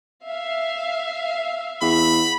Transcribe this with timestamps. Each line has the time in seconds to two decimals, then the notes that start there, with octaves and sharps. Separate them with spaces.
0.25 E5 F5
1.82 E2 B5